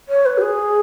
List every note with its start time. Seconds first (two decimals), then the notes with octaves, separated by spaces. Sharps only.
0.09 C#5
0.26 B4
0.38 F#4
0.41 G#4